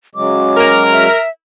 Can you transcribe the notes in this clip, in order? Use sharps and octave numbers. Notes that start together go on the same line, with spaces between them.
C#3 F#3 G#3 D6
A#4
E5